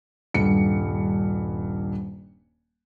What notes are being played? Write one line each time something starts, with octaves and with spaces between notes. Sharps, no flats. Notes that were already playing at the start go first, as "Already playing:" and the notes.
D#1 G2 C#7